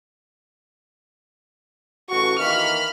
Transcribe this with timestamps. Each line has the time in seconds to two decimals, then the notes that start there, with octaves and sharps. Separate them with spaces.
2.10 A1 F#4 C#6
2.39 D#3 E3 A#3 B5 F6